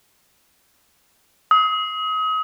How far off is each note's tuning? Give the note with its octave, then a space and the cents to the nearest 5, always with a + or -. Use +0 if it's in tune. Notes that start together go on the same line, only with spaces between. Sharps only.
D#6 +35